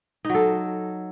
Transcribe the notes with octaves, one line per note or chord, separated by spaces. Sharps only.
F#3 D#4 A4